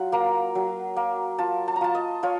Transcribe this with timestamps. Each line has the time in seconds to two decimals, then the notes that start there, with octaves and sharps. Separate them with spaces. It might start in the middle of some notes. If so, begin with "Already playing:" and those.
Already playing: F#3 F4 F#5
0.12 A#3 A#5
0.55 F#3
0.96 A#3
1.38 F4 A5
1.68 A5
1.76 A#5
1.81 F4 A5
1.95 D#5
2.23 F4 C#5